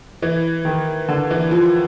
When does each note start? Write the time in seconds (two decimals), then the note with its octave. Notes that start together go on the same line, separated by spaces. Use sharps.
0.22 E3
0.65 D#3
1.09 D3
1.31 E3
1.51 F3